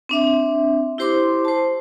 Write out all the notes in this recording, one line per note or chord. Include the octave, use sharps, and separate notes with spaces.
C4 D4 E5
E4 G4 C5 C6 D6
C5 A5